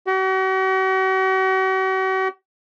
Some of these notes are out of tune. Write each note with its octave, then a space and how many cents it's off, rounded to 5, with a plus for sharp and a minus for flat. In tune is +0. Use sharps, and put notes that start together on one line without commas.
F#4 +45